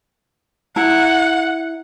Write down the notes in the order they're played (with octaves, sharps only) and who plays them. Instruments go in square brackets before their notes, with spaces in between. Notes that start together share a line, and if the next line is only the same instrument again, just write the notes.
[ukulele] E4 A#5 [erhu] F#5